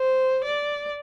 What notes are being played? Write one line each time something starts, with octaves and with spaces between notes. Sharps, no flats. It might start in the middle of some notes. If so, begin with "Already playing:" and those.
Already playing: C5
D5